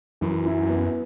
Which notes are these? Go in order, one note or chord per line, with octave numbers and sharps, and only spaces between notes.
F#2 E3
E4
B3